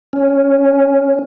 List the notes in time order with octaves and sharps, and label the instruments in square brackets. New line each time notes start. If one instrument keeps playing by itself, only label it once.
[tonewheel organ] C#4